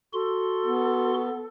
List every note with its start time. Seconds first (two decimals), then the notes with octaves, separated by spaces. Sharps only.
0.13 F#4 A4 C6
0.66 B3